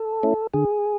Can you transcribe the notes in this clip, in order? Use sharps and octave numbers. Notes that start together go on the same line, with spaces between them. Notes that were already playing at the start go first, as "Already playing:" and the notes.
Already playing: A4
A3 C#4 E4
D3 G#4